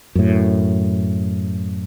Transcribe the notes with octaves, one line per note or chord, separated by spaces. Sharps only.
F#2 A2